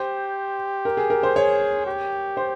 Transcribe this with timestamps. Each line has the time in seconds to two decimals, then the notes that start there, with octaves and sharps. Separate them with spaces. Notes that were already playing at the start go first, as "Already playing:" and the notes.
Already playing: G4 C5
0.85 A#4
0.97 G#4
1.10 A#4
1.23 C5
1.35 G#4 C#5
1.86 G4
2.37 C5